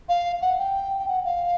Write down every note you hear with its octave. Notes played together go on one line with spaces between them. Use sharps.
F5
F#5
G5
G5
F#5
F5